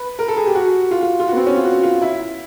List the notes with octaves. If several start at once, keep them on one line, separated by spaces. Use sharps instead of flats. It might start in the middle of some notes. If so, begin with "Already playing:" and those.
Already playing: B4
A#4
A4
G#4
G4
F#4
F4
F4
F4
B3 F#4
C4
C#4
F4
F#4
F4
E4